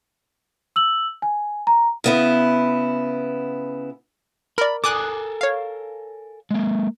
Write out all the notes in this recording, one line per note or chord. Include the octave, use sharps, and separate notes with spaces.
E6 F#7
G#5
A#5
C#3 B3 E4
A#4 D5 B5
A4 A#4 G#5 D6 D#6 F#6
C#5 F5
G#3 A#3